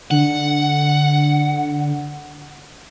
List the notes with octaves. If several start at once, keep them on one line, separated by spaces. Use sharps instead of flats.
D3 F#5